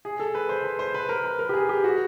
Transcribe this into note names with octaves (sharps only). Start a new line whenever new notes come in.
G#4
A4
B4
C5
B4
C5
B4
A#4
B4
A#4
G4
G#4
G4
F#4